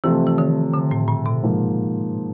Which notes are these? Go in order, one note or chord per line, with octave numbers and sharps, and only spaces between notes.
C3 E3 F3 A3
E3
D#3
D3
A2
A#2
B2
G#2 F3 A#3